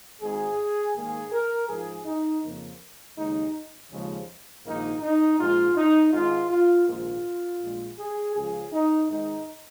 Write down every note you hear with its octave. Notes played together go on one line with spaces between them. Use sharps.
G#1 G#2 G#3 G#4
G#2 D#3 A#3 G#4
A#4
G#2 F3 G#3 G#4
D#4
F2 C#3 F3 A#3
D#2 C#3 G#3 D#4
D#2 C#3 F3 G#3
A#1 G#2 D#3 A#3 D#4
D#4
A#1 G#2 G#3 F4
D#4
G#1 G#2 G#3 F4
F4
A#1 G#2 D#3 A#3 F4
A#1 A#2 G#3
G#4
C#2 C#3 F3 G#4
D#4
G#2 D#3 G#3 D#4